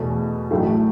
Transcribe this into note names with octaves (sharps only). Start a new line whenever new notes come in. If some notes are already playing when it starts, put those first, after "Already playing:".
Already playing: E2 B2 A3
A1 A2 F#3 A3